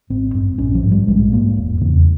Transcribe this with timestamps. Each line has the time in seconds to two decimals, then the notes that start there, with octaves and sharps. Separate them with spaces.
0.10 G#1 C4
0.35 G2
0.58 A#1 C#4
0.75 F3
0.83 G#2
0.91 G3
1.07 A#1 G#3
1.32 G#2 A#3
1.57 E1
1.81 E2 C#3